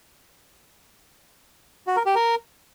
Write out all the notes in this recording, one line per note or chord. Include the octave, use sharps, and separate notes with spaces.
F#4
A#4
G4
A#4